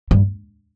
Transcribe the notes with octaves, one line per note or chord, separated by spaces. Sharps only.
G2